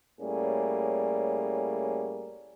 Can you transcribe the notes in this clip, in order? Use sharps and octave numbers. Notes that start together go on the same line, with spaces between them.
A2 G3 A#3 C#4 G#4